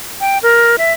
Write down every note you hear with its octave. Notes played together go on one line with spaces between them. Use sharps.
G5
A#4
E5